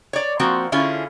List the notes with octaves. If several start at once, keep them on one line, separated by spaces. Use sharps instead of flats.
C#5 D5
F3 A#3 C4 F#4
D3 C#4 E4 F4 G#4